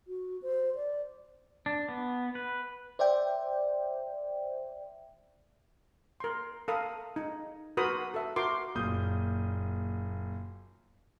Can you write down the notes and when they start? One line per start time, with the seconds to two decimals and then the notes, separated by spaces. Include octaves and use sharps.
0.07 F#4
0.42 C5
0.75 D5
1.66 D4
1.89 B3
2.35 B4
2.99 C5 D5 E5 G5
6.20 A#4 C6
6.68 A4 A#4 F5 B5 D#6
7.16 D#4
7.77 F#4 A#4 B4 B5 C6 D#6
8.14 A4 E5
8.36 F#4 A#4 C6 D6
8.75 F#1 A#2 D#6 G6